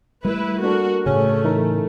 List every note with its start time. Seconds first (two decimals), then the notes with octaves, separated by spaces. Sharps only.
0.25 G3 A3 E4 B4
0.62 A#3 D4 F#4 A4 A#4
1.06 A2 C#3 A3 C#4 G#4
1.44 E3 D#4 A#4